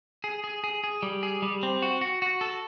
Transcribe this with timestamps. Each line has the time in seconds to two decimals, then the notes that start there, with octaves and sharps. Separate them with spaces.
0.24 G#4
0.44 G#4
0.64 G#4
0.84 G#4
1.03 G3
1.23 G#4
1.42 G3
1.63 C4
1.82 F#4
2.01 F#4
2.22 F#4
2.41 A4